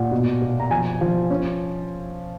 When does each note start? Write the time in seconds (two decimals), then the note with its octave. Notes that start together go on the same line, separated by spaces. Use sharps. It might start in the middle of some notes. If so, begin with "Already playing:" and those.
Already playing: A#2 F#5
0.11 B2
0.42 B2
0.60 A#5
0.71 F3 G#5
1.01 F3
1.30 C#4